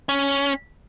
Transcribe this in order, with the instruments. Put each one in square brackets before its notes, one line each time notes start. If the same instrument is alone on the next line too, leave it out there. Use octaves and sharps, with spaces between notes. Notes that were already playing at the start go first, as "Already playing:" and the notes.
[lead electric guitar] C#4